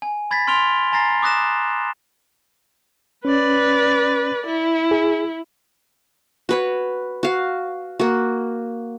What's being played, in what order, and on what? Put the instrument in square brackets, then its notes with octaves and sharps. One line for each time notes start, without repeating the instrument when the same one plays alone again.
[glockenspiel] G#5
B5 G#6 A6 B6
C6 F6 D7 F7 G7
G#5 A#5 A6 A#6 C7
D6 D#6 F#6 A#6 E7
[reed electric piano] C#4 [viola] B4 D5
[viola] E4
[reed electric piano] G#4
[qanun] F#4 B4 C#5
F#4 F5
A#3 F#4